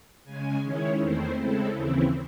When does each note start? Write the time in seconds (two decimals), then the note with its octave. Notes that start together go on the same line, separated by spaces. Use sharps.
0.24 C#3 G#3 C#4 G#5
0.62 D#3 G#3 C#4 E4 C#5
0.99 E2 D#3 A3 C4 E4 C5
1.37 C#3 G#3 C4 E4 A4
1.74 D#2 C#3 E3 C4 E4